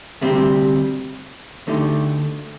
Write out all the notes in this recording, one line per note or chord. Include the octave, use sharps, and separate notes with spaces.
D2 C3 G3 C4 G4
D2 D3 A3 D#4 G4